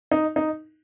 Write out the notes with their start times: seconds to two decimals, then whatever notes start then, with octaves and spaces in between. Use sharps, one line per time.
0.11 D#4
0.36 D#4